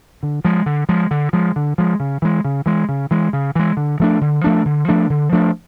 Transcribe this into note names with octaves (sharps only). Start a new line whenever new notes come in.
D3
F3 G#3
D3
F3 G#3
D3
F3 G#3
D3
F3 G#3
C#3
E3 G#3
C#3
E3 G#3
C#3
E3 G#3
C#3
E3 G#3
D3
F3 A3 D4
D3
F3 A3 D4
D3
F3 A3 D4
D3
F3 A3 D4